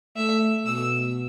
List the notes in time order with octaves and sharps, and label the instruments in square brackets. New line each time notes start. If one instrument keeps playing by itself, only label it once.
[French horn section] A3 [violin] E5
[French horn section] B2 [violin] E6